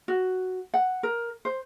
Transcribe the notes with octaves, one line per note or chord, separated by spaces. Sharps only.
F#4
F#5
A#4
C5